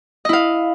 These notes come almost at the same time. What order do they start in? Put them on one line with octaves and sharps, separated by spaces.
D#5 E4 F5